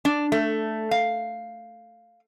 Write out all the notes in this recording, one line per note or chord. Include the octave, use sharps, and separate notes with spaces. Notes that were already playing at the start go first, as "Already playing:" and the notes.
D4
A3
F5